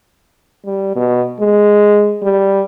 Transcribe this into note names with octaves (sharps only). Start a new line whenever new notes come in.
G3
B2
G#3
G3